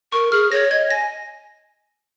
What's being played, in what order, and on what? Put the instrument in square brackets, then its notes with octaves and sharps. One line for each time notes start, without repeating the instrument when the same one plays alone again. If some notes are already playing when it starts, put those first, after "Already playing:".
[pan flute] A#4 [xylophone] C#6
[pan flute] G#4 [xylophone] F6
[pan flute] C#5 [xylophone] A#6
[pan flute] D#5 [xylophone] G#6
[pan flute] G#5 [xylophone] A#6